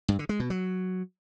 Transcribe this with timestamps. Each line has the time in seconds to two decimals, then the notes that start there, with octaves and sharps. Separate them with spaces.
0.08 G2
0.19 D3
0.29 G#3
0.40 B2
0.50 F#3